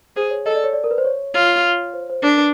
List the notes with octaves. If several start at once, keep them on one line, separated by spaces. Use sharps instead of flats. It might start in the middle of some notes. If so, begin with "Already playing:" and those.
G#4 C5
C#5
A4 D#5
D5
C#5
D5
A#4
B4
C5
C#5
F4 C#5
C5
C#5
C5
D4 A#4
B4